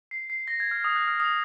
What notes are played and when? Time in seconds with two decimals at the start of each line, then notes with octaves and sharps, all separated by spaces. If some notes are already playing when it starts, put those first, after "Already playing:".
0.11 C7
0.30 C7
0.48 A#6
0.60 G#6
0.71 F6
0.84 D#6
0.96 F#6
1.08 F6
1.20 D#6